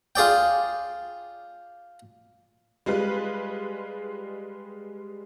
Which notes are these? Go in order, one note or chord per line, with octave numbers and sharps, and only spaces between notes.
F4 G#4 D5 G5
G3 G#3 F4 B4